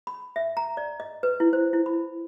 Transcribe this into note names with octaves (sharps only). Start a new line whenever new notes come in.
B5
E5
A#5
D5
D#5
B4
E4
C5
E4
B5